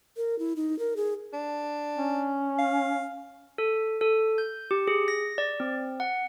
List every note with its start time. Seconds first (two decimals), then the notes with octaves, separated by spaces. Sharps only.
0.17 A#4
0.39 E4
0.56 D#4
0.79 A#4
0.96 G#4
1.33 D4
1.96 C#4
2.59 F5
3.58 A4
4.01 A4
4.38 G6
4.71 G4
4.88 G#4
5.08 A#6
5.38 D5
5.60 C4
6.00 F#5